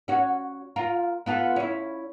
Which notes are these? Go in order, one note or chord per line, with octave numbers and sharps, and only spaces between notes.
C#4 F#4
F4 A#4
B3 F4 A4
C#4 E4